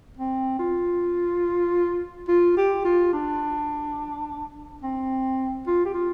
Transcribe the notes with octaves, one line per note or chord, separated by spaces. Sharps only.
C4
F4
F4
G4
F4
D4
C4
F4
G4
F4